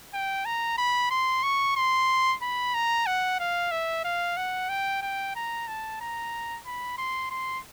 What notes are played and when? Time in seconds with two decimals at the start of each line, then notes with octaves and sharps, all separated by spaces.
0.14 G5
0.46 A#5
0.78 B5
1.11 C6
1.43 C#6
1.77 C6
2.42 B5
2.74 A#5
3.07 F#5
3.40 F5
3.72 E5
4.05 F5
4.37 F#5
4.69 G5
5.02 G5
5.36 A#5
5.68 A5
6.01 A#5
6.66 B5
6.98 C6
7.31 C6